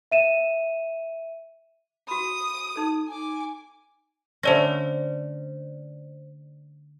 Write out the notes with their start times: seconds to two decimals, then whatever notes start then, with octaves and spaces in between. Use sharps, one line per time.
0.11 E5 D#7 E7
2.08 F#4 B5 D#6
2.76 D#4 A4
3.08 G#5 D6
4.43 D3 A3 C#4 C5 D5 A#6